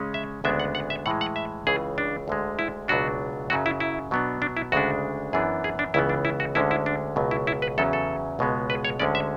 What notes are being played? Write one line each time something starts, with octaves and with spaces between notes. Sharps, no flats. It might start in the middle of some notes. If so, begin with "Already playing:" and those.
Already playing: C#3 G#3 C#4
E5
D2 C#3 G#3 B3 D4 E5
F#5
F#5
E5
A2 E3 G#3 F#5
F#5
E5
C#2 C#3 E3 G#4
D4
D2 D3 G#3
E4
C#2 B2 F#3 B3 D4 F#4
F#2 C#3 F#3 C#4 F#4
E4
E4
B2 F#3 B3 D4
D4
E4
D2 C#3 G#3 D4 F#4
F#2 E3 B3 D4 G#4
G#4
D4
C#2 C#3 E3 B3 E4
D4
E4
F#4
D2 D3 G#3 C#4 E4
E4
D4
C#2 B2 F#3
E4
E4
B4
E2 C#3 F#3 C#4 A4
A4
C#2 B2 G#3 B3
B4
C#5
D2 D3 G#3 C#4 D5
E5